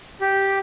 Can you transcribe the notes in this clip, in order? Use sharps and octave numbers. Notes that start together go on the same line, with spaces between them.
G4